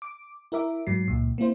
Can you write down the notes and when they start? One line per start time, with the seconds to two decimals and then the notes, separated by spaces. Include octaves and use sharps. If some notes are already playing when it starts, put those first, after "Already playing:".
0.02 D6
0.52 E4 A#4 E5 D6
0.87 G#2 F#3 C7
1.08 C#2 A#2
1.38 A#3 C4 E4 C5